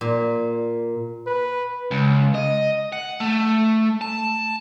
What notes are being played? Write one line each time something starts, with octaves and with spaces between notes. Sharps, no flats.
A#2
B4
C#2
D#5
F#5
A3
A5